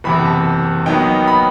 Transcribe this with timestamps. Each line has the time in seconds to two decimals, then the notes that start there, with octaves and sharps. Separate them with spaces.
0.04 F#1 E2 C3 B5
0.25 A5
0.86 D#2 D#3 F#3 B3 D#4 G5
1.28 B5